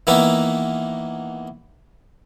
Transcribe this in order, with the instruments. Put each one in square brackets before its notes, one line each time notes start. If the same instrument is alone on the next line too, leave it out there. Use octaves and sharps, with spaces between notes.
[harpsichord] D#3 E3 A#3 B3 E4 B5